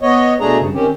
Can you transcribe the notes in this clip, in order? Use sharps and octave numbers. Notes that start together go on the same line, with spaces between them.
B3 C#5 D#5
B2 A3 D4 G#4 A#5
G2 C#3
D#3 C4 C#4 G4